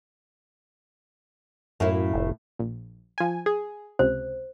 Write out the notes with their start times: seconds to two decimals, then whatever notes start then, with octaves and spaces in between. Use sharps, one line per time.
1.80 F#2 A2 A#3 E4
2.14 F1
2.59 A#1
3.18 F3 G#5
3.46 G#4
3.99 C#2 C3 C5